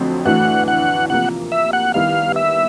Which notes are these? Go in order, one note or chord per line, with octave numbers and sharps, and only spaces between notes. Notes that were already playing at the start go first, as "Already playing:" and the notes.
Already playing: F2 D3 F#3 A3 C4
A2 E3 A3 D4 F#4 F#5
F#5
C3 F3 A#3 F#5
E5
F#5
D#3 G3 B3 E4 F5
E5